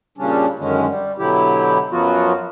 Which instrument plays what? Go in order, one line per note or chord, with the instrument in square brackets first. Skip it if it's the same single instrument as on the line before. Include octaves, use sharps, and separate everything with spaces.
[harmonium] A#2 C#3 G3 C#4 D4
F#2 D3 D#3 G#3 C#4
G3
B2 D3 F#3 E4 G4
F#2 F3 F#3 B3 F4 F#4